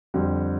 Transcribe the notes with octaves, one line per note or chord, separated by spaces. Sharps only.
F2 D3 G3